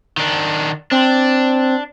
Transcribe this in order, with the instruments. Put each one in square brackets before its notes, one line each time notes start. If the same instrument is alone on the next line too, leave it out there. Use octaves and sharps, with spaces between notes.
[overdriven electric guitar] D#3 D4
[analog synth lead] C4 [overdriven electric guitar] D4